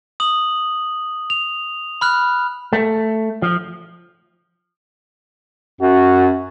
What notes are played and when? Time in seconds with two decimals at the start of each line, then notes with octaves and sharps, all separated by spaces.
0.20 D#6 F#7
1.30 F7
2.01 B5 F6 F#6
2.73 A3
3.42 F3
5.81 F#2 F#4